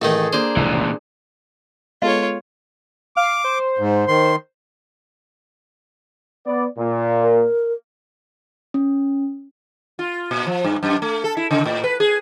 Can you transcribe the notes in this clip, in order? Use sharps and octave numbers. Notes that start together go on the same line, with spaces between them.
A1 D#3 A3 G#4 A4
A#3 D4 G#4 C5
F1 C#2 A#2 C#3 E3
G#3 B3 F4 A4 C#5 D#5 F5
F5 D6
C5
G#2
D#3 C6
B3 D5
A#2
A#4
C#4
F4
A#2
F3
G2
F#2
A3
A4
E4
C#3
A2
B4
G#4